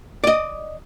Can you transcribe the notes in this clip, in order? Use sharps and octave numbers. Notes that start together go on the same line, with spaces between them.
D5 D#5